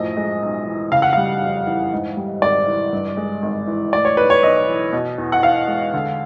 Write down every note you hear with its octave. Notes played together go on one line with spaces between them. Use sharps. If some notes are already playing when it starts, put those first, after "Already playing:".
Already playing: F#2 A2 F3 D#5
G#3
B1
E3
C#3 F5
F#5
G3 F5
F2
E3
G#2
G3
G#1 D5
E3
G2
G#3
G#1
E3
A2 D5
C#5
B1 B4
C#5
B1 D#5
E3
B2
E2
F#5
E2 F5
G#3
D3